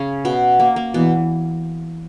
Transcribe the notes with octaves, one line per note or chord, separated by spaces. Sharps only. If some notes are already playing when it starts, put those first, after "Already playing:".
Already playing: C#3 C#4
B2 B3
A#3
A#3
E2 B2 E3 B3